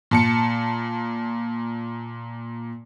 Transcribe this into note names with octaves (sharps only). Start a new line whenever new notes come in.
A#2 A5 C#7